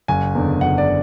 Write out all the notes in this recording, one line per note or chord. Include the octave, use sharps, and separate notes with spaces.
F#1 G#5
E2 D3
F#1 F#5
D5